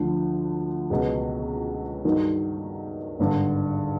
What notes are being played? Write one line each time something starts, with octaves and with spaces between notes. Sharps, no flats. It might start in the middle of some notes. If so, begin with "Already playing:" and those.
Already playing: D2 D3 F3
C#2 B2 F#3 B3
G2 D#3 F#3
G#1 G2 D3